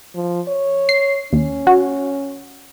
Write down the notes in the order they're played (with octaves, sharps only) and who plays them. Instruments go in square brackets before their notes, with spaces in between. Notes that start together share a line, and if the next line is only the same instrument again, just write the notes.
[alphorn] F3
C#5
[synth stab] C7
[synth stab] D#2 [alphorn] C#4
[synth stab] F#4